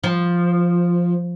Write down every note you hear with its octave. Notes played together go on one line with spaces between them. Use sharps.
F3